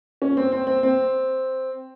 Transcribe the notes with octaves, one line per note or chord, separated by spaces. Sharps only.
C#4
C4
C4
C4
C4